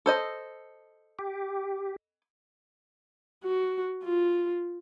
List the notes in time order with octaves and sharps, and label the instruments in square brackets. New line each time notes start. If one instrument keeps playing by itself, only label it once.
[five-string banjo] A4 C5 D#5
[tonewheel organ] G4
[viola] F#4
F4